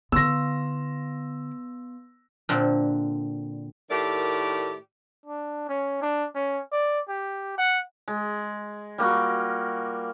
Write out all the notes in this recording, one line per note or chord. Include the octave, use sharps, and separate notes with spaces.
D3 B3 E4 C6 E6 A#6
A#2 D3 C4
A2 D#3 A3 G4 A#4 D5
D4
C#4
D4
C#4
D5
G4
F#5
G#3
G3 A#3 F4 F#4